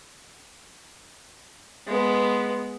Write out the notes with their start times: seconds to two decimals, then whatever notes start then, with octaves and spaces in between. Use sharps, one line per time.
1.88 G#3 B3